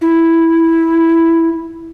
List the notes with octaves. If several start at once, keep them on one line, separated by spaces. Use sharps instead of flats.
E4